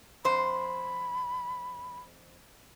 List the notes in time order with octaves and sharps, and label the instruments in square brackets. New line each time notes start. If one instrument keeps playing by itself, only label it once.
[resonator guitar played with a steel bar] F2 C5 [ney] B5